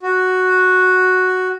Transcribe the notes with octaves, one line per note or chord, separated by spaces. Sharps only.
F#4